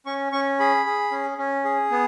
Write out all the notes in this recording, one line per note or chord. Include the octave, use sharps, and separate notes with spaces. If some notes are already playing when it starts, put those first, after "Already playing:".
C#4 C#6
C#4 C#6
G#4 B5
G#4
C#4
C#4
G#4
B3